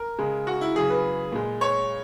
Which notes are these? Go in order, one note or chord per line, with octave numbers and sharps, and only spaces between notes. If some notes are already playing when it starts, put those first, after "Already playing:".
Already playing: A#4
C#3 G#3
F#4
E4
C#3 F#3 G#4
B4
A#2 G#3
C#5